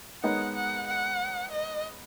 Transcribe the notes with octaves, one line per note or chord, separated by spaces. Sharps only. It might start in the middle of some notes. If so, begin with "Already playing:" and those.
G#3 B3 D#4 A#4 C#5 F#5
F#5
F#5
D#5